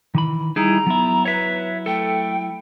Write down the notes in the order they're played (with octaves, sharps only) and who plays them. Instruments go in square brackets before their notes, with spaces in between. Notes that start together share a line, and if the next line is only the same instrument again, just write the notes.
[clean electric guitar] D#3 E3 B5
[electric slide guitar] G3 E4 G#4 [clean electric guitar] D#4 [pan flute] A#5
[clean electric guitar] F#3 E4 [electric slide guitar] B3
[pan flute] B4 [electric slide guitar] C#5 E5
[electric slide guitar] A3 A4 [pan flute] G5